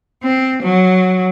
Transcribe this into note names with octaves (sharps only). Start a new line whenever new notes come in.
C4
F#3